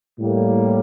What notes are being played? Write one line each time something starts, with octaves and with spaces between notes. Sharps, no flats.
A2 G3 A#3